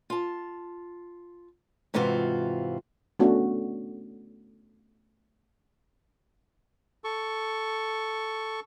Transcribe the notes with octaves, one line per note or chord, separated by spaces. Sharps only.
F4 A5
G#2 C3 E3 F4 F#4
A3 B3 C#4 D4 F#4
A4 C#6